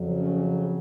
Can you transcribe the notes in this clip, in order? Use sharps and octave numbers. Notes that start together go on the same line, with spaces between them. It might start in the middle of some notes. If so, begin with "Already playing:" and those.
Already playing: F2 C#3 F#3
C#4